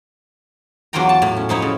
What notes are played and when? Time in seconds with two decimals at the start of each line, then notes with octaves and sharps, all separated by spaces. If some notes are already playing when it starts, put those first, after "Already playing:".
0.93 E2 F#3 D4 F4 G5 A#5
1.09 A5
1.22 A2
1.37 C#4
1.49 F3 D#4 E4 C#5
1.62 C#3